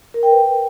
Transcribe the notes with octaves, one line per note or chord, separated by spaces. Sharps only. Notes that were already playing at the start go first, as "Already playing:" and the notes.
A#4
G5
B4